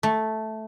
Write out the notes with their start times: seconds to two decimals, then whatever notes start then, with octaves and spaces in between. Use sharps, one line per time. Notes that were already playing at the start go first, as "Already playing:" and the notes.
0.03 A3